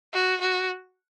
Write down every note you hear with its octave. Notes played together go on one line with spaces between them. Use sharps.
F#4
F#4